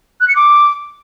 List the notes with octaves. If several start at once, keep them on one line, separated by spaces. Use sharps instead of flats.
F#6
C#7
D6